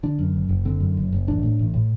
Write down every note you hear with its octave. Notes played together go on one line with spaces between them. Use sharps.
D3 D4
F#2
F#1
F#1
D3 C4
F#2
F#1
F#1
A1 D4
A2
A1
A2